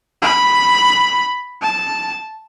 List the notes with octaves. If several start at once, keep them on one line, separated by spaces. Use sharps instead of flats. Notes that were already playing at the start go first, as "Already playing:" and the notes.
B5
A5